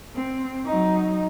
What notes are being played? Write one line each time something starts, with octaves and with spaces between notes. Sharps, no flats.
C4
F#3 D#4